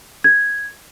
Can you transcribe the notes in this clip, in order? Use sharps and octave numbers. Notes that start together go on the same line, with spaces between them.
G#6